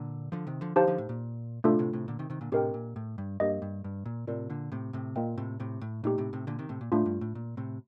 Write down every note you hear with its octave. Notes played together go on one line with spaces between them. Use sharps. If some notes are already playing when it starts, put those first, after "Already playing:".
Already playing: A#2 D3
D3 F3
C3 D#3
D3 F3
D3 F3 D#4 G4 C5 F5 A5
D3 F3
A2
A#2
A2 C3 A3 D4 F4 A4
A2 C3
A2 C3
A#2 D3
C3 D#3
C3 D#3
A#2 D3
A2 C3 D4 G4 A#4 D#5 G5
A#2
A2
G2
G2 A#3 D4 G4 A#4 D#5
G2
G2
A#2
A2 C3 F4 A#4 D5
A#2 D3
A2 C3
A2 C3
A#2 A#3 F4 A#4 D#5 G5
A2 C3
A2 C3
A2
A#2 A3 D#4 G4
A2 C3
A2 C3
A#2 D3
C3 D#3
A2 C3
A#2
A2 A3 D4 F4
G2
A2
A#2
A2 C3